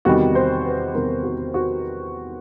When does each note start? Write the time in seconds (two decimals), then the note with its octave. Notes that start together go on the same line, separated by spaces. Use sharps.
0.05 E2 C3 D#3 G3 F#4
0.35 C5
0.65 B4
0.95 E2 C3 D#3 G3 A#4
1.24 F#4
1.54 F#4